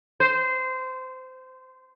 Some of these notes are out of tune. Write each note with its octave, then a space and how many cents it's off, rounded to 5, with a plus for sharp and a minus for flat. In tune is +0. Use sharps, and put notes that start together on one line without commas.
C5 -20